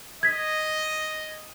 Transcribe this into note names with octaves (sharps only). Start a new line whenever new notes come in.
D#5 G#6 B6